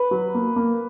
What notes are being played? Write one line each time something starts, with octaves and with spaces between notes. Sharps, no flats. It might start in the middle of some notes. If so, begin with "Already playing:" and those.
Already playing: B4
F#3
A#3
A#3